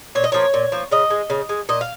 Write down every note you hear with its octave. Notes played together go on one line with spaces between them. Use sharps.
A#2 C#5
D#5
F3 A#3 C#5
A#2
F3 A#3
C#3 D#5
G#3
C#3
G#3
A#2 D#5
F5